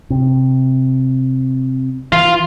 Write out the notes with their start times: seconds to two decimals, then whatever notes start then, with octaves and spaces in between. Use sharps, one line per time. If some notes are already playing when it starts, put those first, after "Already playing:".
0.10 C3
2.12 E3 F4